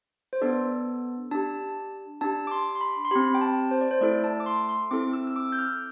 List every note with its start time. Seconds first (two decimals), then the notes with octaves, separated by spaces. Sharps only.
0.33 C5
0.42 B3 D4 A4 D5
1.31 D4 G4 A5
2.21 D4 G4 A5
2.47 D6
2.51 C6
2.75 C6
2.81 B5
3.05 C6
3.11 C4 G4 B5
3.35 G5
3.41 A5
3.71 C5
3.81 D5
3.91 C5
4.01 A3 E4 A4 D5
4.24 A5
4.40 D6
4.46 C6
4.69 C6
4.91 C4 E4 A4 D6
5.13 E6
5.27 E6
5.36 D6
5.52 G6
5.59 F6